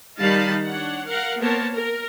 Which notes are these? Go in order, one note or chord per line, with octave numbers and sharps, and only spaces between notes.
D#3 G3 D#4 F5 A5 B5
D4 C#5 F#5
A#4 F5 F#5
A#3 B3 A#4 C5 C#5 A5
A#4